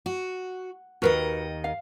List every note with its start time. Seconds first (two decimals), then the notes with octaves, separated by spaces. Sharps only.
0.06 F#4
1.02 D#2 D#3 F#4 A#4 B4 D#5
1.64 F5